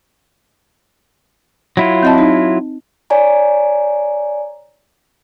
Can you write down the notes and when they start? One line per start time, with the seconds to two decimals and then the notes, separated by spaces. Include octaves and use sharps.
1.77 F#3 E4 F4
2.03 C4 D#5 A5
2.18 D#4
3.10 C#5 D5 G#5 A#5